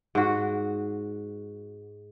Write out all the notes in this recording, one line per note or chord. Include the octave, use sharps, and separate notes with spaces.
G#2 F#4